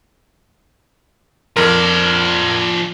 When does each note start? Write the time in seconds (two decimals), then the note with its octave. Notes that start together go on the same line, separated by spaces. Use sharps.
1.57 F2 F3 A#4 D5